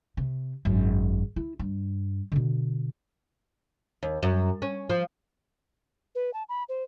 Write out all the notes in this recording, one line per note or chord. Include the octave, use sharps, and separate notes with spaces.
C3
G#1 F#2
E4
G2
B2 D3
D#2
F#2
C#4
F3
B4
A5
B5
C5